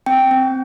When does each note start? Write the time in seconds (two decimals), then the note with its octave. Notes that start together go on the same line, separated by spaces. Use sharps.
0.06 C4 G5
0.31 C4